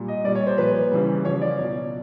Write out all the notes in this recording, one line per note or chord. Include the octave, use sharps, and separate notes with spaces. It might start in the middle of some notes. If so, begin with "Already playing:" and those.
Already playing: A#2 G3
D#5
A#2 G3 D5
C#5
C5
A#2 F3 B4
C#3 E3 G3
C#3 F3 C#5
D5
B2 F#3